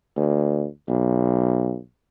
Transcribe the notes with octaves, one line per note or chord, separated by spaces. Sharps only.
D2
B1